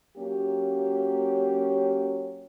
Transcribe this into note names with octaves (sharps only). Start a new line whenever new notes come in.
F#3 A#3 C#4 G4